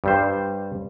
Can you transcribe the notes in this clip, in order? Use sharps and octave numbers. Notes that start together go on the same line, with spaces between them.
G2 G3 C5